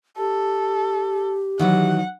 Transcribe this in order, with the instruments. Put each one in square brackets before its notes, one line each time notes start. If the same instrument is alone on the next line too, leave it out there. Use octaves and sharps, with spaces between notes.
[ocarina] G4 [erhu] A4
[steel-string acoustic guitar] D#3 E3 F#3 [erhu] F#5